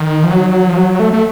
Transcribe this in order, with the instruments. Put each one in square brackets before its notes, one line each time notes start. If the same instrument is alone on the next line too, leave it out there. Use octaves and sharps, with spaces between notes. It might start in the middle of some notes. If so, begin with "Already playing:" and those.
Already playing: [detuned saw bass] D#3
F3
F#3
F3
F#3
A3
A3